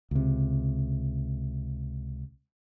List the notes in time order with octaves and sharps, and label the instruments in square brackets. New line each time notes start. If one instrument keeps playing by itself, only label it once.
[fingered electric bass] C#2 C3